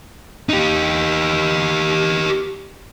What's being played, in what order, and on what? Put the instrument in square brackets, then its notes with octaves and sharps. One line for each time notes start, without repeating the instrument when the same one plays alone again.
[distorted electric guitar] D#4 G4